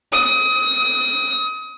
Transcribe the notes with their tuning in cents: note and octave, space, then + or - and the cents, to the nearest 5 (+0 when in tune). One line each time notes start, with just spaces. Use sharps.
D#6 +30